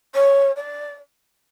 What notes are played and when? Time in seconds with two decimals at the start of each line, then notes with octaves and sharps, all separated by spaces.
0.14 C#5
0.56 D5